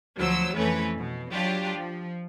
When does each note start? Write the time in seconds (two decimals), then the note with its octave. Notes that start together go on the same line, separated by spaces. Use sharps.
0.17 D2 F3 F#3 C5 E6
0.55 F2 E3 A3 C#4 B4
0.98 B2
1.33 F#3 D4 F4 G4
1.79 F3